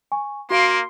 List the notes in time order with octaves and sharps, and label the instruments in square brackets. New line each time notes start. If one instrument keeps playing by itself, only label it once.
[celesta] G#5 C#6
[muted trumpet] A#3 [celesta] F#4 F5 D7 [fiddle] C6